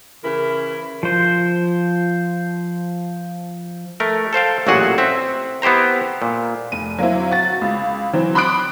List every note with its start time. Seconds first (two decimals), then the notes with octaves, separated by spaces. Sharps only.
0.24 C#3 E3 E4 A#4
1.03 F3 C5
4.00 A3 A#4
4.33 A4 C5 F5 G5
4.67 A1 A#2 F#3 F#4 G#4 F#5
4.98 C4 E5
5.62 B3 E4 G4 C5 A#5
6.22 A#2
6.72 F1 D#7
6.98 F#3 A#3 C4 E4
7.31 F#4 A6
7.61 C#2
8.13 E3 F#3 C4
8.35 B5 C6 D6 D#6 F#6 D7